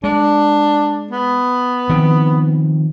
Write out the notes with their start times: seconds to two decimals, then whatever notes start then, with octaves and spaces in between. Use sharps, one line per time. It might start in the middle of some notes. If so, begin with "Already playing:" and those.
0.04 G#3 D4
1.11 B3
1.89 D#3 F3 C4